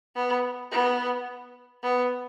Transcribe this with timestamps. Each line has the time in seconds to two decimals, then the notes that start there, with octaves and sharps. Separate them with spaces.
0.15 B3
0.71 B3
1.83 B3